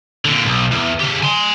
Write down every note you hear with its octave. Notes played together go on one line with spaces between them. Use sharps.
A#2 D3
B1
E2
C#3 G4
G#5 C6